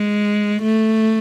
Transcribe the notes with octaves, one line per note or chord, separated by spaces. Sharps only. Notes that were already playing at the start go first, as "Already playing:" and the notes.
Already playing: G#3
A3